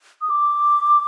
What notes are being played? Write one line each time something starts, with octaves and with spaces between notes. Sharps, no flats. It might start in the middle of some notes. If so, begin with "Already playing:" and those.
D#6
D6